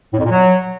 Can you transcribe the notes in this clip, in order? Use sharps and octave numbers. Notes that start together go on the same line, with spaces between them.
A2
F2
A#2
F#3